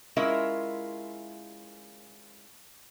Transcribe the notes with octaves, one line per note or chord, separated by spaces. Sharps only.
G#3 C#4 E4 F4 A#4 E5